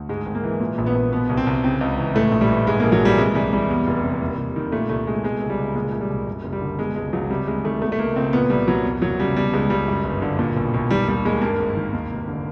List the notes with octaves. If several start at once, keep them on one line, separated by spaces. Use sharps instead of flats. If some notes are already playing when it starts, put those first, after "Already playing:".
Already playing: D2
G#2 G#3
G#1
A#3
E3
A#2
A#1
B3
A#1
B2 B3
C2
C4
C2
C#3 C4
C#2
E3
A2 A3
A#1
G3
E3
G#2 G#3
A#1 A#3
F#3
E3 G3
C3 G#3
C2 G3
E3 G3
E2
F1
C3
D#2
F1
D#3
A#2 A3
C2 A3
C2 G#3
B2 G#3
C#2
G3
C#2
A#2 G#3
C2
G3
C2
F#2
F#1
G3
D3
B2 G#3
C#2 G#3
C#2 F#3
C3 G3
D2 G#3
D#3 A3
B2 A3
A3
C#2 A#3
C#2 C4
A#2 B3
C2 G3
C2 F#3
E2
F#1 F#3
C#3 G3
B2 G3
C#2 G#3
C#2 G3
F#2
G1
D3
A#2
B1
B1
D#3 G3
D#2 G3
D#2 G#3
G2 A#3
G#1
D#3
D#2
F1
D3